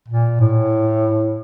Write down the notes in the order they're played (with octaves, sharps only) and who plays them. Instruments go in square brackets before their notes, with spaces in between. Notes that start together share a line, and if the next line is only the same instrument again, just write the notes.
[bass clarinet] A#2
A2